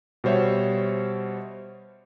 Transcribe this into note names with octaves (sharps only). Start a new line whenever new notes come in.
B2 G3 C5 C#5 E5